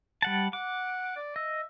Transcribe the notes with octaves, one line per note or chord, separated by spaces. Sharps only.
G3 F#5 A5
F#5 D6
D5
D#5 E5